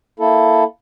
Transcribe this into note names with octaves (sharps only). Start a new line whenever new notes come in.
A#3 E4 A4